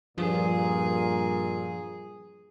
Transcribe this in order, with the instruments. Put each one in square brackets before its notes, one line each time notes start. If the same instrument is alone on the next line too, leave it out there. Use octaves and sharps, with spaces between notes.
[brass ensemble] G2 A#2 [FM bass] F3 [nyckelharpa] G#4